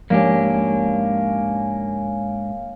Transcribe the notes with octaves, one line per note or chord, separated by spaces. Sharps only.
G#2 F3 A#3 C#4 D4 G4